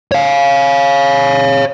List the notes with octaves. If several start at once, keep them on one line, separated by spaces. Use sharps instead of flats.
C#5 F5